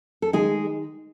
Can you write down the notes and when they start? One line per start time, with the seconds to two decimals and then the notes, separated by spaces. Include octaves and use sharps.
0.22 A4
0.33 D#3 G#3 G#4